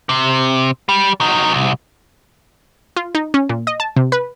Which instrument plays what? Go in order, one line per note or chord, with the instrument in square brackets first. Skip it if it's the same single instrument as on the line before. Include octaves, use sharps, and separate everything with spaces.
[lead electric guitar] C3
G3
F#3 D#4
C2
[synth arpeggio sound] F4
D#4
C#4
A#2
D#5
A5
C3
B4